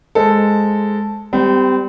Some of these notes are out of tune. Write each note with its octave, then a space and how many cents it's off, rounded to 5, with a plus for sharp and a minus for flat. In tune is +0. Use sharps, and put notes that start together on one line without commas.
G#3 +0 A4 +0 C5 +0
G3 +0 C4 -30